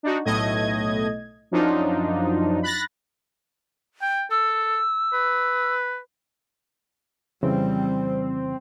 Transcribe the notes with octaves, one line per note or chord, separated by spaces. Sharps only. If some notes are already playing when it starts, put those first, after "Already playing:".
D4 D#4 F#4
B1 A2 A3 D#5 G#6
F#2 F3 F#3 D4 D#4 F4
B5 F#6 A6 A#6
G5
A4 E6
B4
F2 C#3 E3 G3 C4